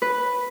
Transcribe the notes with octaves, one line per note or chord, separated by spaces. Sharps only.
B4